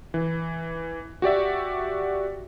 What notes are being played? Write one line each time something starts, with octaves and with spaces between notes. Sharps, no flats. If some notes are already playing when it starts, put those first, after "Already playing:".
E3
F#4 G4 D5 E5